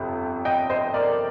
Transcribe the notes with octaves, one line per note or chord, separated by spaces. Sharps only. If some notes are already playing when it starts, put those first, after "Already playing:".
Already playing: G1 F2 C3
D#5 G5
C5 D#5
A#4 D5